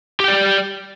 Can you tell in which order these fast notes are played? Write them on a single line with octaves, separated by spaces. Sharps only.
G4 G5 D5